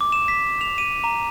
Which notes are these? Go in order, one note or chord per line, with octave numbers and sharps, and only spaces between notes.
D6
E7
B6
F7
D#7
A#5